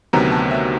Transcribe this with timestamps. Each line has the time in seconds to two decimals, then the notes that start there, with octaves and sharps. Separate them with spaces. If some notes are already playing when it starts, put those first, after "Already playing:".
0.13 D2 C3 D#3 F#3 B3 A#5
0.32 A5
0.51 E5